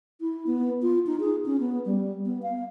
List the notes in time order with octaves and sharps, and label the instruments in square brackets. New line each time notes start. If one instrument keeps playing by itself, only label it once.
[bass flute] E4
B3
F4
D#4
G#4
C#4
B3
G3
B3
F5